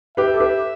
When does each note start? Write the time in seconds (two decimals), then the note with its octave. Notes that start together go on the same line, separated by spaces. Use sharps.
0.17 G4 B4 E5
0.34 A4
0.40 G4 B4